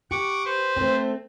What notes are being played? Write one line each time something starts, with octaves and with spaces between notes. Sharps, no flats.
G4 F#5 C#6 D6
B4 C5
A3 C4